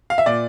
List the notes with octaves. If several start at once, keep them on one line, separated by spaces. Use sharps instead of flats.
F5
E5
A#2 D5